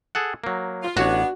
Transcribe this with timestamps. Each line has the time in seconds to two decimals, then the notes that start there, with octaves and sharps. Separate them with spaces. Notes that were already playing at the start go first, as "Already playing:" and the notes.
0.15 G#4 A4 F#5
0.44 F#3 A#3
0.83 F4
0.97 A1 B3 D4 F#4 C#5